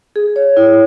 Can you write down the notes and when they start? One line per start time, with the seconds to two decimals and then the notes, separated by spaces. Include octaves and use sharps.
0.16 G#4
0.36 C#5
0.57 E4